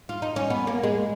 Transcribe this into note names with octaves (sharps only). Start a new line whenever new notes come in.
F4
D#4
C#4
B3
A#3
G#3